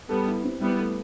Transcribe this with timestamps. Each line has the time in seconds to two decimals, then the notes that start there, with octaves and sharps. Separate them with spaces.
0.09 G3 B3 A4
0.28 E4
0.44 C4
0.61 G3 B3 E4
0.78 A3